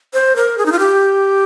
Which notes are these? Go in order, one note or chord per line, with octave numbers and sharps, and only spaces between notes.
C5
A#4
G#4
D#4
F4
G4